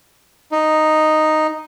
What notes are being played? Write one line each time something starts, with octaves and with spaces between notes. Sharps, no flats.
D#4